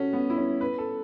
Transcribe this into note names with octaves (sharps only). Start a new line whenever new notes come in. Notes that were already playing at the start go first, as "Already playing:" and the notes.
Already playing: C#4 F#4 A4
B3
E4
C#4
B4
A4